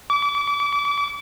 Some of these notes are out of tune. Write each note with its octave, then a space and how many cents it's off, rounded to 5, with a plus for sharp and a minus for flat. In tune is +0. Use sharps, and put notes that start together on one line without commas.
D6 -35